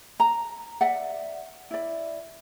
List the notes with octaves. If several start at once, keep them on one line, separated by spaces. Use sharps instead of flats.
A#5
D5 E5 F#5
E4 D5